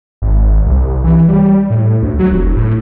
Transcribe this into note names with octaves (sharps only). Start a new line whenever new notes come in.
G#1
C2
E3
G3
A2
D2
F#3
F1
A2